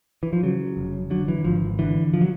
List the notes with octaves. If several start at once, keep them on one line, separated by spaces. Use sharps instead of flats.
E3
F3
C#3 F#3
F1
D3 F#3
E3
G#1 F3
D3 E3
F3
F#3